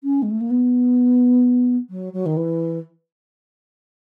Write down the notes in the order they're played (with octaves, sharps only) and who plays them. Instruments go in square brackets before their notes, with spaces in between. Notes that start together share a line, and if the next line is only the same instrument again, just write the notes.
[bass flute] C#4
G#3
A3
A#3
B3
F#3
F#3
D#3
E3